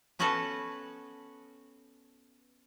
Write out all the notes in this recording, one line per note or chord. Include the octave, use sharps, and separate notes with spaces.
B3 C#4 F#4 A4 B4 A5